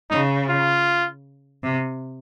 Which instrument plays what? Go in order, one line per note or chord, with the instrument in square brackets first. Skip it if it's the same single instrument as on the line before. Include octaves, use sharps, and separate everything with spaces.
[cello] C#3 [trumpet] D#4
[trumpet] F4
[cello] C3